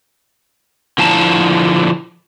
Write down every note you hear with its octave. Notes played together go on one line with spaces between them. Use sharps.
D3 F3 E4 A5 A#5